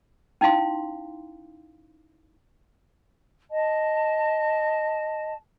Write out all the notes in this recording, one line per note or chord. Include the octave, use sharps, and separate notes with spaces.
C#4 D#4 E4 F5 C6
D#5 A5